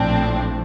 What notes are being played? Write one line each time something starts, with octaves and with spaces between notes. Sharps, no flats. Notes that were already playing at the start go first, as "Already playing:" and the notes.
Already playing: A#1 A2 F3 C4 D4